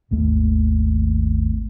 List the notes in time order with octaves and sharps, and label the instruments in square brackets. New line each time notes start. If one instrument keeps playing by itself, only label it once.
[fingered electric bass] G#1 D#2 A3